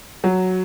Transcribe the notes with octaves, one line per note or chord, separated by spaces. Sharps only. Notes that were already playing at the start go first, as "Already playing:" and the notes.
F#3